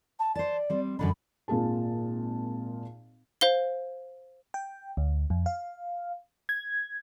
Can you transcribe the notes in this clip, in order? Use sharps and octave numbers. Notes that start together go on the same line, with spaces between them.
A5
C5 D5 A5
G3 C4
F#2 D3 D4 B5
G#1 A#2 F4 G#4 A5
C5 F5 G7
G5
D2
F2
F5
G#6